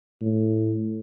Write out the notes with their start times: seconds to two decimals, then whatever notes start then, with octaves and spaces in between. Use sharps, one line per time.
0.21 A2